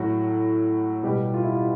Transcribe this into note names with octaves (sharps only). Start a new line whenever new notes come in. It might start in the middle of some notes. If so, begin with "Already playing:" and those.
Already playing: A2 F#3 F#4
B2 G3 G4
F4
E4
F4